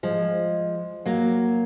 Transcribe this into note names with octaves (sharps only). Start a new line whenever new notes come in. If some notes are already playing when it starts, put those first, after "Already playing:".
F3 G#3
F#3 A#3